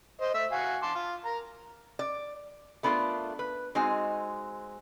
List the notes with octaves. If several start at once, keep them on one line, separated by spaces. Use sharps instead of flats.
C5 D#5
A3 E5
F#4 F5 G#5
A5 C6 D6
F4
A#4 A#5
D5
A3 B3 D4 E4 F4 A#4
B4
G#3 C4 D#4 F#4 G#5